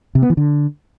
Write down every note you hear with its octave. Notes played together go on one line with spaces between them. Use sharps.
C3
B3
E3
D3